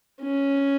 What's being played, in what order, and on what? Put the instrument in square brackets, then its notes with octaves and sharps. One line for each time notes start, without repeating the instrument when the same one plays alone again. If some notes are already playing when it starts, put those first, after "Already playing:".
[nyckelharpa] C#4